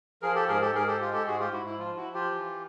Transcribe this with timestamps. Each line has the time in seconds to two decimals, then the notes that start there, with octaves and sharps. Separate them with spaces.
0.22 F3 G#4 A#4
0.35 G4 A4
0.48 G#2 G#4 A#4
0.61 G4 A4
0.74 G#2 G#4 A#4
0.87 G4 A4
1.01 G#3 F4 G4
1.13 G4 A4
1.27 G#2 F#4 G#4
1.40 F4 G4
1.52 G#2 E4 F#4
1.66 E4
1.78 F3 F4
1.97 E4 F#4
2.05 F3
2.14 F4 G4
2.31 E3